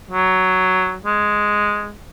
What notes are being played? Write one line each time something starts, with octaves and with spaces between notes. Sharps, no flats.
F#3
G#3